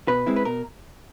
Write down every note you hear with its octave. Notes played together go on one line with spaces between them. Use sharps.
B2 B4
G#3 C4 E4
B4
B2 A#4